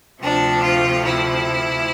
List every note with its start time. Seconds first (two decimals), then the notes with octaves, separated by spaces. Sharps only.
0.21 D2 C3 F3 A3 D4
0.62 F4
1.03 E4